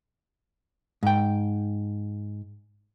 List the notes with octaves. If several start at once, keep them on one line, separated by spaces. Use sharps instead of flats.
G#2 G5